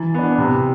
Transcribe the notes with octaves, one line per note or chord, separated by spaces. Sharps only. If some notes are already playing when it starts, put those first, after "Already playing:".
Already playing: E3 E4
B3 D4
C3